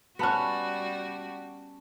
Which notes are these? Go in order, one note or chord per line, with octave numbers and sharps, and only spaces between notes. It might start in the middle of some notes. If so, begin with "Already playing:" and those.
G3 B3 C#4 F#4 F#5 A5 F#6